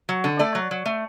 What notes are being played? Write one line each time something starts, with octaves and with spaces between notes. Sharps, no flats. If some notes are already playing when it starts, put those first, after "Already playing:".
F#3
D3
A3 D5
F#3
F#3
A3